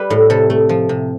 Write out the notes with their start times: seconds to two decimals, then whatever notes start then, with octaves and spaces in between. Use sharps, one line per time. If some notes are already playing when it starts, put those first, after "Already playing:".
Already playing: G3 B4
0.10 A2
0.30 C3 A4
0.50 A3
0.69 F3
0.89 C3